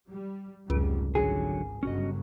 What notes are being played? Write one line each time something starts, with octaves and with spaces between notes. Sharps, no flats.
G3
F1 C#2 G#2 G3
G#1 D3 F#3 C#4 G#4
G1 C#3 F#3 C#4 F#4 D#5